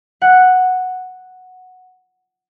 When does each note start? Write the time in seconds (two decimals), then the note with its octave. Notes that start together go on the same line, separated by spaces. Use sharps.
0.22 F#5